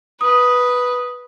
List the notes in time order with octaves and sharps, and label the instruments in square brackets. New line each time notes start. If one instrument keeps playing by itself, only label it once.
[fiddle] B4 [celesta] D#6